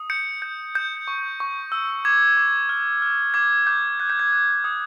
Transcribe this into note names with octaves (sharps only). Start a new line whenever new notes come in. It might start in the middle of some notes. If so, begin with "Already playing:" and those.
Already playing: D#6
G6 C#7
G6
G6
C#6
C#6
E6
D6 G#6
D6
F6
F6
D6 G#6
D6 G6
F#6 G#6
G6
G#6
F#6
D#6